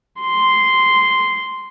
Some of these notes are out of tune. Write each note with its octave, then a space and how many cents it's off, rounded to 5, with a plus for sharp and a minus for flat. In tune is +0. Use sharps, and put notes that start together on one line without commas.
C6 -5